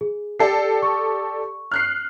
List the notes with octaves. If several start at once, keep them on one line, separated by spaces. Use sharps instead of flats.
G#4
G4 A4 D5 C7
C#6
F6 F#6 C7